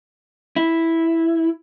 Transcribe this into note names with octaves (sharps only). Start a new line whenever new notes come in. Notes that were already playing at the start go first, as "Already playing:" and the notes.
E4